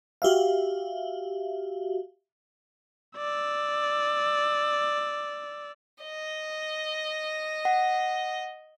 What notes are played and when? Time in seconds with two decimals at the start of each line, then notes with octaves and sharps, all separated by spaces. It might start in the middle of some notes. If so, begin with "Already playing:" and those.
0.22 F#4 G4 E5 F5
3.17 D5 E6
6.04 D#5
7.65 F#5